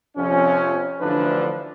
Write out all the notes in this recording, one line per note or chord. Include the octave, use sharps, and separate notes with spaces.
F2 C3 F3 C#4
A1 A2 D3 F3 D4 B4